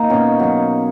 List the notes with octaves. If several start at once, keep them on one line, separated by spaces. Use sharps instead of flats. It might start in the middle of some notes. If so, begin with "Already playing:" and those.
Already playing: A#3 D#4
B2 C#4
F#3